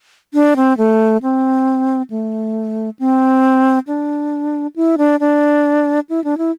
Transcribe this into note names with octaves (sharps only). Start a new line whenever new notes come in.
D4
C4
A3
C4
A3
C4
D4
E4
D4
D4
E4
D4
E4